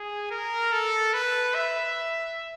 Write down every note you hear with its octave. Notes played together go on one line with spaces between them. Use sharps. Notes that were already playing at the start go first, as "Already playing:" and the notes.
Already playing: G#4
A#4
A4
B4
E5